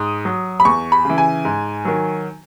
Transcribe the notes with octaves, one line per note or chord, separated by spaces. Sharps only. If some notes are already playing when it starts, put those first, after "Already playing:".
Already playing: G#2 D#6
F#3
B5
E2 C#6
B5
C#3 E3
G#5
G#2
D#3 F#3